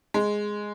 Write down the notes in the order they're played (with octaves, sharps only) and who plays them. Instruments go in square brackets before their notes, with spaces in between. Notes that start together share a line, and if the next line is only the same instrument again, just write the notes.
[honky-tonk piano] G#3